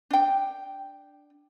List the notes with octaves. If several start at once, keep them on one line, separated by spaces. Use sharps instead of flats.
D4 G5